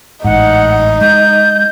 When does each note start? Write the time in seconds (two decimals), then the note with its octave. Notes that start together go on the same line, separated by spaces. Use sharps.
0.24 A1 G#2 D#4 F#5
1.01 G#3 G6